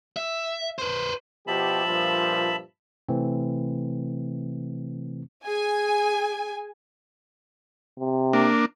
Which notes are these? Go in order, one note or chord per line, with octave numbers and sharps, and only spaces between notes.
E5
B4 C5
B2 F3 G4 E5 A5 B5
G2 A#2 F3
C3 E3 A3 C4
G#4 G#5
C3
A#3 D4